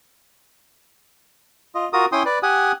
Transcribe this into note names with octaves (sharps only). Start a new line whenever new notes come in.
F4 D#5
F4 F#4 A#4 D#6
C#4 E4 G5 C6 D#6
B4 D5
G4 F#5 G#5 D#6